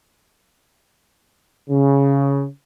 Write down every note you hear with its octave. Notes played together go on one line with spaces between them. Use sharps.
C#3